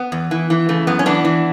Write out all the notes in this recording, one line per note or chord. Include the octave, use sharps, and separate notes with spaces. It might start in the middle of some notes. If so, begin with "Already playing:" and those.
Already playing: B3
E2
E3
E3
C#3 A3
F#2 B3
C#4
E3 B3 D4
E3